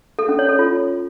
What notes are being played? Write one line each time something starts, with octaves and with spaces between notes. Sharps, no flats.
A4
C#4
C#5
A4
F4